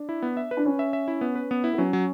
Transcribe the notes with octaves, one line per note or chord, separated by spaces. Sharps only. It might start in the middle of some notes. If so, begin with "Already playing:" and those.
Already playing: D4
E4
B3
E5
B4
D4
C#4 B4
E5
E5
E4
B3
B4
B3
E4
B3
F#3 C#4
F#3